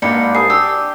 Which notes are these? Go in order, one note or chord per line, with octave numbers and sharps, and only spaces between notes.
G#2 A#3 D4 G4 B4 C#7
C2 G#5 A5 D#6 C7
D4 G4 E6